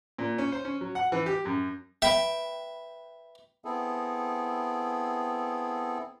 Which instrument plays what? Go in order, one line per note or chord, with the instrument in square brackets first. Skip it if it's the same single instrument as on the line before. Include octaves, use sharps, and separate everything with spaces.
[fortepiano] A#2
C#4
C5
C#4
F#3
F#5
E3
G4
F#2
[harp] B4 G5 [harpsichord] E5
[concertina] B3 C4 E4 G#4 A4